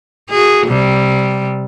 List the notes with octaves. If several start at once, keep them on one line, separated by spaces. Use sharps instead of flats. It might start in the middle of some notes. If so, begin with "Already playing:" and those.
F#4 G#4
C3 G3